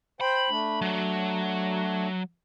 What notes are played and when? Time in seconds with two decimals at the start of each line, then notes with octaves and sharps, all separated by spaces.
0.21 C5 G5 B5
0.50 A3 D4
0.81 F#3